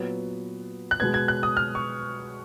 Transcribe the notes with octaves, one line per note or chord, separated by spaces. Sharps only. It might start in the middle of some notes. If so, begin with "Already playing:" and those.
Already playing: A#2 F#3 B3
F#6
B2 G#3 B3 G#6
G#6
F#6
D#6
F6
C#6